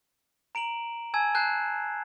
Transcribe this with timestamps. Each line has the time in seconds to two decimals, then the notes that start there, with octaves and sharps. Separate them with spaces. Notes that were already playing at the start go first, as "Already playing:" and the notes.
0.55 A#5 D7 E7 F#7
1.14 G#5 A5 E6 G#6
1.35 A5 F#6 G6 C7 E7